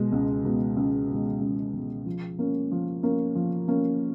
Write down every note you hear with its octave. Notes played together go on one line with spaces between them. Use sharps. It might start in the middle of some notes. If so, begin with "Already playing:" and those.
Already playing: B2 G#3
C#2
B2 G#3
C#2
B2 G#3
C#2
B2 G#3
F3
A#3 C#4
F3
A#3 C#4
F3
A#3 C#4